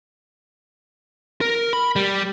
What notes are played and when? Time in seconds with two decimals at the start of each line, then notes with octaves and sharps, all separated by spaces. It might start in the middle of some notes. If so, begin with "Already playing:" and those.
1.41 A#4
1.73 B5
1.96 G3